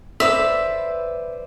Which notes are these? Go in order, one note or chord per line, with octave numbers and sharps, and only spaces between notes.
B4 C5 D5 E5